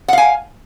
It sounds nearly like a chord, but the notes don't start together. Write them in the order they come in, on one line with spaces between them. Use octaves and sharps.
F#5 F5 G#5